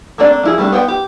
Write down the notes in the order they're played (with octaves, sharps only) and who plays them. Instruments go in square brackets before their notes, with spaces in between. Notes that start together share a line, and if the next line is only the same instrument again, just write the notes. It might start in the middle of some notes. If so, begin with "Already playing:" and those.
[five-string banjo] A3 A#3 C4 D4 D5
F3 E4 G#4
G3 A3 C4 D4
B3 C5 G5
G4